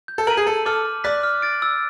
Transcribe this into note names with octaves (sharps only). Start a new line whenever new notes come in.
G6
A4
A#4 B6 D#7 F#7
G#4
A4 A5
A4 D6 F6
A5
D5 D6 F#6 B6
F6
A6 D7
E6